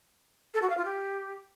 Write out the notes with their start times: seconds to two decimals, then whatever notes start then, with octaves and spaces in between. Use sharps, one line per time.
0.54 A4
0.61 F#4
0.69 F5
0.77 F4
0.85 G4